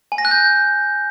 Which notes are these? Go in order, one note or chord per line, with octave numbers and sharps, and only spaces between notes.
G#5
A#6
F#6
G6